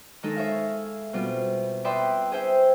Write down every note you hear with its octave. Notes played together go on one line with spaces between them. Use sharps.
D#3 G#3 D#4 G#4 A4
C#5 E5 F5
B2 G3 C4 F4
B4 D5 E5 G5 C6 D#6
G#4 C5 E5 G5